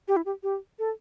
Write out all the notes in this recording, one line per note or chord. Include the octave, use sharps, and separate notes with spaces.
G4
E4
G4
G4
A4